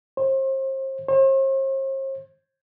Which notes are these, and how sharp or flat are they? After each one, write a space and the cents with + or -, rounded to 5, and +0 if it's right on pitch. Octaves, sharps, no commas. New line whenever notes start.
C5 +35
C5 +45